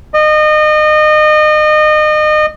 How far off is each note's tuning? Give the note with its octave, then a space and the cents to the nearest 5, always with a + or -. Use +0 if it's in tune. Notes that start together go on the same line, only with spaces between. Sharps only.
D#5 -30